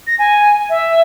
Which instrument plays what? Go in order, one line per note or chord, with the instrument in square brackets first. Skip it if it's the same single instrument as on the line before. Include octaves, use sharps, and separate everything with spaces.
[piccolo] A#6
G#5
E5